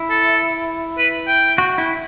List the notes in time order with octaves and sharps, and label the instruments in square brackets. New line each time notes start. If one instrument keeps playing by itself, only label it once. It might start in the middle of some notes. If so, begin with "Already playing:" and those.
Already playing: [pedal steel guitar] E4
[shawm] A4
B4
G5
[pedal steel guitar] F#4
E4